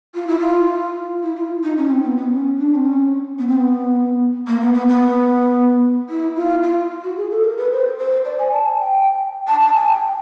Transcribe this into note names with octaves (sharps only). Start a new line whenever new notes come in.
F4
E4
F4
E4
F4
D#4
C#4
C4
B3
B3
C#4
D4
C4
C#4
B3
C4
B3
A#3
B3
B3
B3
E4
F4
F4
F#4
G#4
A4
A#4
B4
C5
C5
D5
G#5
A5
G#5
G5
A5
A5
G#5
G5